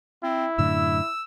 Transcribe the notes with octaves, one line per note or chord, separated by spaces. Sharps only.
C4 E4
F#2 A2 D3 E6